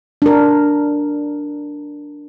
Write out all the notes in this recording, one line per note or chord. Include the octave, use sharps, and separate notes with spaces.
D4 A#4